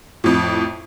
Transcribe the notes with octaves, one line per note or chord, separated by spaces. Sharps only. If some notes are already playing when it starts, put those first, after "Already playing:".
F2 A2